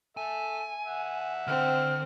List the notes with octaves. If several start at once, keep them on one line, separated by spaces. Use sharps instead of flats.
A4 E5 G#5
E5 F#5
D3 C4 F6